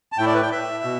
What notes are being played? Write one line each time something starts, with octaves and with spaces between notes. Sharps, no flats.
A5
A2 A3 E4 G5
D5
B4
G5
E5
B2